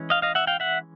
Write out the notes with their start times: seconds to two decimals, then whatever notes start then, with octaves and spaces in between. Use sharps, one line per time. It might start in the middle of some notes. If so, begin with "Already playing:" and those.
Already playing: E3 G#3 C#4
0.10 D#5 F5
0.22 D#5 F5
0.35 E5 F#5
0.47 F5 G5
0.60 E5 F#5